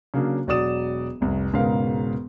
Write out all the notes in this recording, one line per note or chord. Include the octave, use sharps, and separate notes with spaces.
C#3 F#3 A#3 D4
E1 F#3 F#4 D5 D#6 E7
F1 C2
E1 G#2 C#3 B3 A#4 F5